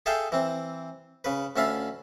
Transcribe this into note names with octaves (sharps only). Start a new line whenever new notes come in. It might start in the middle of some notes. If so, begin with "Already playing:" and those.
G#4 A4 E5 F5 G5 A5
E3 C4
C#3 B4
D2 C#4 E5 F5 A5 B5